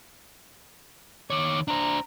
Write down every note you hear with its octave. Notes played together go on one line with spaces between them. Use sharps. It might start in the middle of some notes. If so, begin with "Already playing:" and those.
D#3 C#5 D6
D4 C5 A#5